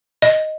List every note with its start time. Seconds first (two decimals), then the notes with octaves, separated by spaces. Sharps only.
0.22 D#5